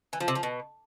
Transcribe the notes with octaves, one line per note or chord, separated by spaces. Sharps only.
E3
F3
C3
F3
B2